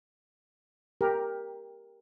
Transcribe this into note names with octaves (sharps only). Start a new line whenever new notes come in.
G4 A#4